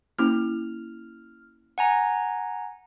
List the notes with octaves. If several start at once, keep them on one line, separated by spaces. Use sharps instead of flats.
A#3 C#4 E4 F6
F#5 G#5 A#5